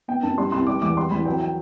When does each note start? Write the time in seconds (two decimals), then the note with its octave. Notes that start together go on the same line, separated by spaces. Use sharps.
0.08 B3 G5
0.23 F#2 A5
0.38 G3 C6
0.52 C2 C6
0.67 G3 D6
0.82 E2 D6
0.97 G3 C6
1.11 E2 B5
1.25 F#3 G5
1.40 G5